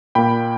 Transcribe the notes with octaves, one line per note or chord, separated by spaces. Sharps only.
A#2 A#3 G5 B5